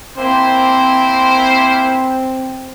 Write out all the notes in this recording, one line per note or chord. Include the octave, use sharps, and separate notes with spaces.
A#3 C4 E4 C5